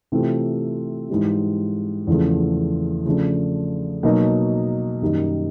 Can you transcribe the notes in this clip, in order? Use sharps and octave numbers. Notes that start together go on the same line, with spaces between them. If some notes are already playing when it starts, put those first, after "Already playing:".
C3 E3 A3 C4 F4
G#2 E3 G3
E2 C#3 F3 A3
C#3 F3 A3 D4
B2 F#3 A#3 D#4
F#2 D#3 G3 A#3 D#4